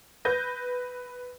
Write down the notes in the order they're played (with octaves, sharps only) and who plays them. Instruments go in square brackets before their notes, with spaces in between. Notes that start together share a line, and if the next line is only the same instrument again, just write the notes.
[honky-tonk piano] B4 G6 A#6